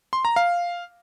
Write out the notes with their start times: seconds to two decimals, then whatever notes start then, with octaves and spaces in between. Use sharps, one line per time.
0.13 C6
0.25 A#5
0.36 F5